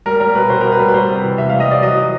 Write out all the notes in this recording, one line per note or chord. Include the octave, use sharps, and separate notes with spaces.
G3 A#4
G3 A#4
B2 B4
B2 C5
B2 A#4
B4
G3
B4
G3 C5
C3
E3
C3 E5
G3 F5
D#5
E3 D5
F#3 D#5
F#3